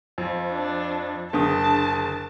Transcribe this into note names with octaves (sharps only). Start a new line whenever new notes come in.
F2
D4
F#1 D3 A5 D#6